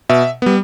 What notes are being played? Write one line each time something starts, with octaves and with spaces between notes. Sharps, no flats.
B2 E5
G3 B3